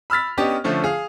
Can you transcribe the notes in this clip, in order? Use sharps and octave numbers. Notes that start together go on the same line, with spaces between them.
B5 E6 F6 A6 B6
B3 C#4 D4 G4 D#5
D3 F3 A3 C#4
G#4 F5